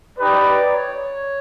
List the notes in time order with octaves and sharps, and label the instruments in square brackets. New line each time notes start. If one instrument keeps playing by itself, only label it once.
[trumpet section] D#4 G4 B4 [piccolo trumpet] D5
[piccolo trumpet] C#5